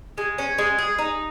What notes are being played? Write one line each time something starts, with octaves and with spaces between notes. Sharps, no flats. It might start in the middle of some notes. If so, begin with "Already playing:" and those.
G#3
C#4
G#3
G#4
D#4